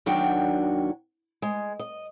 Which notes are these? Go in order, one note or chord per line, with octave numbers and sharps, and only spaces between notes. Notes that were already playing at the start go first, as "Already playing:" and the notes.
D#2 D#3 F#3 D4 F#4 G5
G#3
D#5